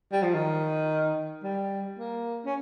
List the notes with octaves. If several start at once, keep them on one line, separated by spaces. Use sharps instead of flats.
G3
F3
D#3
G3
A#3
C#4